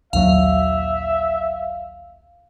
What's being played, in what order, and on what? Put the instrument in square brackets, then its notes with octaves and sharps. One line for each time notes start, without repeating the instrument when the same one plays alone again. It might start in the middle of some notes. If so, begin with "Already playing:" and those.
[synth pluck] A#1 D#2 F#3 [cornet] E5 [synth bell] F5